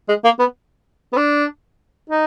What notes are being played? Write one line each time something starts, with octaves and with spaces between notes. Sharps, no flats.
G#3
A#3
B3
B3
D4
D#4